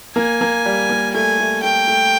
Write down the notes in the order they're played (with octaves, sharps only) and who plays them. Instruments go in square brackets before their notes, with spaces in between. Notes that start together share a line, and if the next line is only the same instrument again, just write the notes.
[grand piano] A#3 [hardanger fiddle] G#5
[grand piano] A#3
G3
A#3
[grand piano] A3 [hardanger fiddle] G#5
[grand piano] A3
[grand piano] A3 [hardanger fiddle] G5
[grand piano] A3